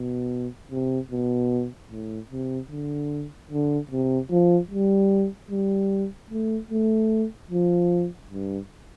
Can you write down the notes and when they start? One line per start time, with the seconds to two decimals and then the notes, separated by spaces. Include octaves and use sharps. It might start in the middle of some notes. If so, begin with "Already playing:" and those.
Already playing: B2
0.71 C3
1.11 B2
1.91 A2
2.31 C3
2.71 D3
3.51 D3
3.91 C3
4.31 F3
4.71 G3
5.51 G3
6.31 A3
6.71 A3
7.51 F3
8.31 G2